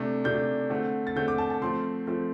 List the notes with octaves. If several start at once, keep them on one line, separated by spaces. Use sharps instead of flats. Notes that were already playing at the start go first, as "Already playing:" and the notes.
Already playing: C3 A3 D4
C3 A3 D4 G6
D3 A3 C4
A6
D3 A3 C4 G6
D6
A5
A5
F3 A3 C4 C6
F3 A3 C4